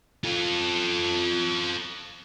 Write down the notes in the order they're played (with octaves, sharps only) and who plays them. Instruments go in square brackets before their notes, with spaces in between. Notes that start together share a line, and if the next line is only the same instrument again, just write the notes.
[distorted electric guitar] F4 A4